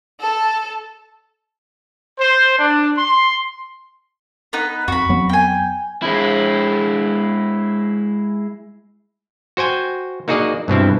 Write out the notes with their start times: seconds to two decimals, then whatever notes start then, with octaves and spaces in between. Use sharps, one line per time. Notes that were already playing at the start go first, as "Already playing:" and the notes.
0.20 A4 A5
2.20 C5
2.58 D4
2.97 C6
4.53 B3 D#4 B4
4.88 F2 F#4 B5
5.09 F2 F#3 B3
5.29 G5 G#5
6.02 G#3 E4
9.57 F#4 C5 G5 G#5
10.28 A#3 D#4 F#4 G#4 D5 D#5
10.68 G2 B2 C4 E4